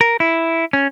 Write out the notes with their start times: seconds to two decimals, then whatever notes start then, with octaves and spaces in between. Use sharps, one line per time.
0.01 A#4
0.20 E4
0.73 C#4